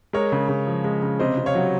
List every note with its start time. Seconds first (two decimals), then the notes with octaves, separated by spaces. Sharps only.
0.13 G#3 A#4 C#5
0.32 C#3
0.49 C#3
0.67 F3
0.84 G#3
1.02 C#3
1.19 C3 C5 D#5
1.38 C3
1.46 C#5 F5
1.55 F#3